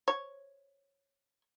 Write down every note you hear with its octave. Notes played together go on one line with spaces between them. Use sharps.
C#5